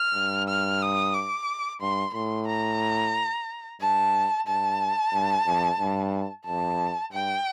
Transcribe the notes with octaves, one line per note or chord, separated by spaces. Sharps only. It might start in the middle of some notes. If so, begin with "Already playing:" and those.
Already playing: F6
G2
F6
D#6
D6
G2 C6
A2 C6
A#5
G2 A5
G2 A5
G2
F2
G2
F2 A5
G2 G5